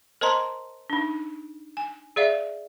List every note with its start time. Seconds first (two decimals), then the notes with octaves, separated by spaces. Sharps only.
0.21 A#4 C5 D#5 A5 A#5 C6
0.90 D4 D#4
1.77 G#5
2.16 G#4 D5 E5 F5